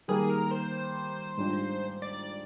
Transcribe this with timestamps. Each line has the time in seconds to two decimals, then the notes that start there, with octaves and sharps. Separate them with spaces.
0.08 D#3 G3 A#3 G#4
0.30 A#4
0.51 C5
1.37 G#2 G3 D4 F4
2.02 D5